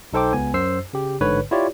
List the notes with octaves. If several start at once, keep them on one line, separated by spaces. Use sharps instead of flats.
B1 D#4 A4 C5 G5 D6
C#2 B3 G#5
F#2 C5 E6 C7
C#3 G4
A1 G#2 D3 B4 C#5
E4 F4 G4 C#5 D5